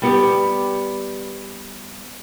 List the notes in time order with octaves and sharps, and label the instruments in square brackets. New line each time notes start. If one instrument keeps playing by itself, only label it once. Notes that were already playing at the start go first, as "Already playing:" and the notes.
[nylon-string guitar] G3 B3 G4